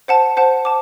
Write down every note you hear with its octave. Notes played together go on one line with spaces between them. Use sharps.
C5 F#5 A5
C5 F#5 A5
A5 D6